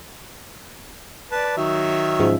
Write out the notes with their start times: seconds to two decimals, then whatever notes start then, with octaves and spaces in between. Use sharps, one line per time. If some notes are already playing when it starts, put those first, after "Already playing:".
1.32 B4 D5 A5
1.57 D#3 F#3 E5
2.19 G#2 C#3 F3